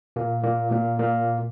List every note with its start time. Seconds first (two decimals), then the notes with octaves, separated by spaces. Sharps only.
0.16 A#2 A#3
0.44 A#2 A#3
0.71 A#2 A#3
0.99 A#2 A#3